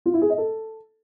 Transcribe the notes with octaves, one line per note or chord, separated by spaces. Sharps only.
F4
E4
G#4
D#5
A4